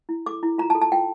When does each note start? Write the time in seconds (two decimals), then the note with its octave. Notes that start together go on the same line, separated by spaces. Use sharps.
0.09 E4
0.26 A4 D6
0.43 E4
0.58 F4 A#5
0.70 A5
0.75 A4
0.82 A5
0.92 F4 G5